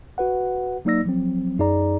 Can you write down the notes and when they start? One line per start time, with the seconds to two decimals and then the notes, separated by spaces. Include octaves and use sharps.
0.18 F#4 B4 F#5
0.85 F#3 A#3 D#4 D5 E6 A#6
1.05 F3 F#3 C4
1.59 F#2 D#4 G#4 D5 A#5